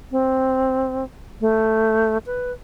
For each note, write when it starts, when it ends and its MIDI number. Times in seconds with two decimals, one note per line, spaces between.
0.12 1.04 60
1.41 2.18 57
2.26 2.52 71